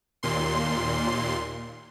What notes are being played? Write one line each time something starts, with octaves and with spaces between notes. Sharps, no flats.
D#2 A#2 C6